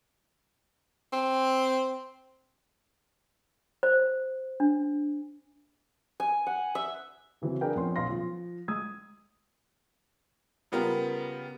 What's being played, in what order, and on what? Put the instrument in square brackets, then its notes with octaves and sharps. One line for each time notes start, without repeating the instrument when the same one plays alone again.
[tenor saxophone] C4
[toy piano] C5
D4
[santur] G#5
F#5
E5
[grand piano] C#3 E3 F#3 C4
D4 G#4 A#4 B4 G5 G#5
F2 B3 C#4 C6
B1 B3 F5 C6 A#6
F3
G#3 D#6 E6 G#6
[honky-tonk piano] C#3 G3 B3 F4 G4 A#4